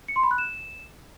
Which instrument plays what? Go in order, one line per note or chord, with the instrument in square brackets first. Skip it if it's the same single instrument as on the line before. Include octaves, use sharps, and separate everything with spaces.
[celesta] C#7
C6
B5
F#6
E7